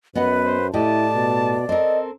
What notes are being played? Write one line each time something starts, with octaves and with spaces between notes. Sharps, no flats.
F#2 B3 B4 D#5 F#5
C5
A2 E4 G4 D5 D#5 A5
B2
C4 A4 A#4 D#5